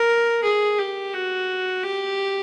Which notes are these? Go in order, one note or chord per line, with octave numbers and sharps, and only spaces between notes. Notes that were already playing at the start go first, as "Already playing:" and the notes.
Already playing: A#4
G#4
G4
F#4
G4